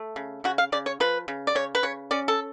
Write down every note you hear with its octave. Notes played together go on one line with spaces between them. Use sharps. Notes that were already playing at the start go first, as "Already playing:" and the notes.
Already playing: A3
C#3
C#3 F#4
F5
C#3 D5
C#5
F3 B4
C#3
D5
C#3 C#5
B4
C#3 C#5
C#4 D5
A4